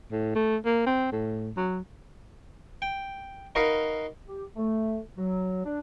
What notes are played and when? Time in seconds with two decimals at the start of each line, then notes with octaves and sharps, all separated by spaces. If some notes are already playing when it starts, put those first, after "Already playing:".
0.11 A2
0.35 A3
0.65 A#3
0.87 C4
1.12 A2
1.57 F#3
2.82 G5
3.55 D#4 F#4 A#4 B4 D#5 F5
4.26 G4
4.56 A3
5.16 F#3
5.65 D4